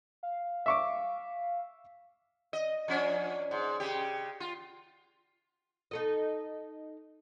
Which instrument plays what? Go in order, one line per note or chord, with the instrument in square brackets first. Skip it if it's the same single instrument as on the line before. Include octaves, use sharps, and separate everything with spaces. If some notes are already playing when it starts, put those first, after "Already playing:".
[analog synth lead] F5
[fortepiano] E5 C#6 D6
[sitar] D#5
F3 C#4 D4
G#2
C#3 G4
F4
[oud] D#4 A4 D#5